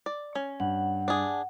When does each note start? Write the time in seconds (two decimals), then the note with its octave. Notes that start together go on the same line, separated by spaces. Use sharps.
0.06 D5
0.35 C#4
0.60 G2 F#5
1.08 D4 G#4